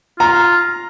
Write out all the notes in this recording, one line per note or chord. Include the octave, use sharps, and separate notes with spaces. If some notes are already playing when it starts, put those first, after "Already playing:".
F4 A#5